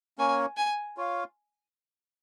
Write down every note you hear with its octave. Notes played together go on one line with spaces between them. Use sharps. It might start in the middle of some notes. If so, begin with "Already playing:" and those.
A#3 C#4 A#4 C#5 G#5
G#5
F4 C#5 F5